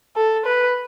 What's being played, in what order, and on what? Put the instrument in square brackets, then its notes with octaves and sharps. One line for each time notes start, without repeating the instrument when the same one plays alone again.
[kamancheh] A4
B4